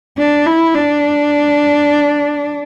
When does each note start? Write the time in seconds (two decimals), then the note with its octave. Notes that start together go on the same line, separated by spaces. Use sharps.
0.18 D4
0.47 E4
0.75 D4